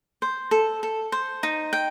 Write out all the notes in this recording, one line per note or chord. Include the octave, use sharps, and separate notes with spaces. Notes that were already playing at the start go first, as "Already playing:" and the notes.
C5
A4
A4
C5
D#4
G5